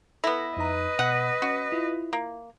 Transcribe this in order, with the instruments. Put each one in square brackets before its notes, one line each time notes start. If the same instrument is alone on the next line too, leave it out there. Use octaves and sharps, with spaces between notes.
[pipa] B3 E4 [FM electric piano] A4 A#6
[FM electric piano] F2 D#4 A#5 [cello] B4 D#5
[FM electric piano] B2 [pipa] F#5
[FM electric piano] C#4 [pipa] F#4
[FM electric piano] E4 F4
[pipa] A#3